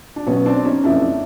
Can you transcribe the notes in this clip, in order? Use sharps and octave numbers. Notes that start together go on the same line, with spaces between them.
D4
B1 B2 F#3 B3 C#4
C4 D4
C#4 D#4
F#1 F2 C#3 D4 E4